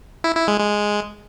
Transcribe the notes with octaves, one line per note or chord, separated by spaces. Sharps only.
E4
E4
G#3
G#3